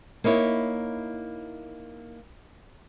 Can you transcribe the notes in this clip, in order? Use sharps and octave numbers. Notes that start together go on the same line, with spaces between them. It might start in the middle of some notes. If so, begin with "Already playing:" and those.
A#3 D#4 E4 C#5